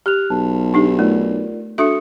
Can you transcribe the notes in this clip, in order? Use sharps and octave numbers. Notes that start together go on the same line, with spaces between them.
G4 F6 F#6 F7
B1 A5
D4 D#4 G4
A3 F4 A#4 D5
D4 F#4 A4 E5 D#6 C#7